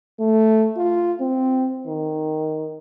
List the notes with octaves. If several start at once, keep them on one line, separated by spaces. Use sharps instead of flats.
A3
F4
C4
D#3